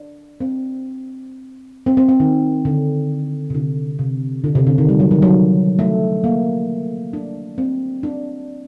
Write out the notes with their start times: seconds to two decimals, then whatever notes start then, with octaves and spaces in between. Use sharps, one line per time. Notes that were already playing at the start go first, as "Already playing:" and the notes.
Already playing: D4
0.41 C4
1.86 C4
1.97 C4
2.09 C4
2.20 D#3
2.65 D3
3.50 C3
3.55 D3
3.99 C3
4.44 D3
4.55 C3
4.67 D3
4.78 D#3
4.89 G3
5.00 F#3
5.11 D#3
5.22 F#3
5.79 A3
6.24 A#3
7.13 D4
7.58 C4
8.03 D4